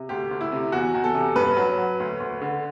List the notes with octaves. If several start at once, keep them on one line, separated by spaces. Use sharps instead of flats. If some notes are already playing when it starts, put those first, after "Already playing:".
Already playing: C3
D2 G4
D2
E4
C3
E2 F#4
E2
A4
C3
G2 B4
F#3
F#3
D2
D2
D3